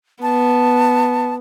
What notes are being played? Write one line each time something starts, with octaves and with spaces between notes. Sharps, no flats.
B3 A5